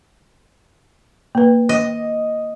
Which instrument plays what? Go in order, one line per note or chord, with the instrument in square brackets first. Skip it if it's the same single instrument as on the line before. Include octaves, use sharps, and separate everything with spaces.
[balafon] A#3 B4
[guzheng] D#5